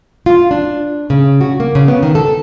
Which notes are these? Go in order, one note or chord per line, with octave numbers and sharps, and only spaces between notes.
F4
D4
C#3
F#4
A#3
C#3
B3
D#3
A4